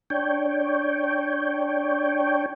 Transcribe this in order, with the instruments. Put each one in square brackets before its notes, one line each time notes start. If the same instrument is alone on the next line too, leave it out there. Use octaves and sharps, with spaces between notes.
[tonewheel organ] D4 C#5 G5